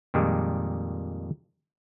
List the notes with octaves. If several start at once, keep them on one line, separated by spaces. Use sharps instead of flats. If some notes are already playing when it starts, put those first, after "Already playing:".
F2 A#2 D#3 G3 G#3